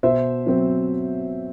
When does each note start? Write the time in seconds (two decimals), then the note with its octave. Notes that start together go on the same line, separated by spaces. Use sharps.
0.03 B2 C5 E5
0.46 F#3 C4